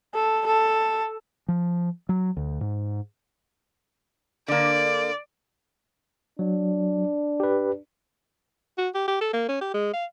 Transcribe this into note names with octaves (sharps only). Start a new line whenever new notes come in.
A4
A4
F3
F#3
D2
G#2
D3 A#3 D5
F#3 D4
G4 B4
F#4
G4
G4
A4
A#3
C#4
G4
G#3
F5